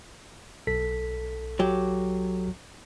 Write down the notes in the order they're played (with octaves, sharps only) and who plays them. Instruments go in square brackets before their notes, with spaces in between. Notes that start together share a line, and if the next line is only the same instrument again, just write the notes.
[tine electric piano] B1 A4 B6
[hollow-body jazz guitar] F#3 G4